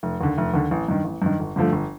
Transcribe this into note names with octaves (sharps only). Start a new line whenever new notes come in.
F1
D#2 D3
F1
D#2 D3
A1
G2 D#3
A1
G2 D#3
G1
G2 D3 F3 A3
G1